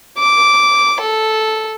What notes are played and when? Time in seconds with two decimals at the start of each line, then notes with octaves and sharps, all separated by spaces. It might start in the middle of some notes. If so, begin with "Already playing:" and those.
0.18 D6
1.01 A4